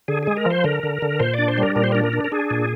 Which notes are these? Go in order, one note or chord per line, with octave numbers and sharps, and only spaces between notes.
D3 G#4
G#3 G#4
A#4
F3 C5
D3 A#4
D3
D3
A#2 C5
D4 D5
C5
G3
A#4
A#2 A#4
C5
A#4
D4
A#4
D4
A#4
D4 G#4
A#2